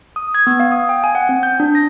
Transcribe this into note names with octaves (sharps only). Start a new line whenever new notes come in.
D#6
G#6
B3
F5
D#6
G5
G#5
F#5
C4
G6
D4
A#6